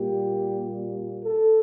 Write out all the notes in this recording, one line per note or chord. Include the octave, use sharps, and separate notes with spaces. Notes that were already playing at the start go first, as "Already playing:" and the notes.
Already playing: A#2 G3 A#3 G4
A4